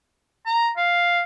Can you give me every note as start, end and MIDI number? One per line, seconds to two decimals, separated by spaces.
0.46 0.70 82
0.77 1.23 77